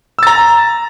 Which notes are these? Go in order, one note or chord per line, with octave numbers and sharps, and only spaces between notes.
A#5 E6 A6